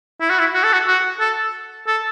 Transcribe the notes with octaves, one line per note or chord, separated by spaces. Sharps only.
E4
F#4
E4
F#4
A4
F#4
F#4
A4
A4